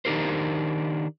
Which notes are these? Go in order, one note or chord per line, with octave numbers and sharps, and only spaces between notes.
D#3 D4 D#4 G4 A#4 C5